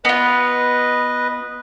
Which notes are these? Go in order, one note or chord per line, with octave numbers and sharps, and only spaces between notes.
B3 F4 B4 D#5